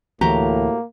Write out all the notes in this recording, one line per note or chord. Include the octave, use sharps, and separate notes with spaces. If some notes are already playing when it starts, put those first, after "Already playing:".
D2 A2 E3 A#3 F#4 G4 A#5